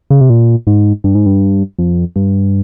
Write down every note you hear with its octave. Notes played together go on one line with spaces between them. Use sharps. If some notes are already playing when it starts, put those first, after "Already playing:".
C#3
C3
A#2
G#2
G2
G#2
G2
F2
G2